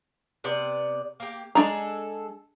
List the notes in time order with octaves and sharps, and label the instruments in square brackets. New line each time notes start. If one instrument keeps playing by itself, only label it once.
[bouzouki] C3 B3 D5
A#3 G4
[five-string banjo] G#3 D4 A#5 [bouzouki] G#4 A4